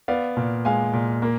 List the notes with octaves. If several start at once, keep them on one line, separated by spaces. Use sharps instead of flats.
B3 D5 F5
A#2
G#3 F5 G#5
A#2
A#3